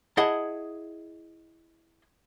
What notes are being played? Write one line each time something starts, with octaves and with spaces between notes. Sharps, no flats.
E4 G#4 D#5 F#5 A5